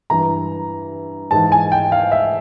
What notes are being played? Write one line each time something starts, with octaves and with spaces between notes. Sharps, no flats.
G2 E3 A#5
G#2 E3 A5
G#5
G5
F5
E5